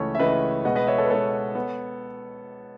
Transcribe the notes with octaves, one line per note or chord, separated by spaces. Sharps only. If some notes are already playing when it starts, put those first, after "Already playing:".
Already playing: C#2 C#3 E3 A3 C#4 A4 C#5
E5
C#2 C#3 E3 A3 C#4 B4 D#5
B2 G#3 B3 D#5 F#5
B4 D#5
C#5 E5
A4 C#5
B4
B2 G#3 B3 A4 C#5
B3